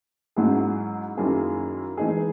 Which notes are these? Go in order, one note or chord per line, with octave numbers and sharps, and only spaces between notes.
G#2 F#3 C#4 E4 G#4
F#2 D#3 A#3 E4 G#4
E3 G#3 D#4 G#4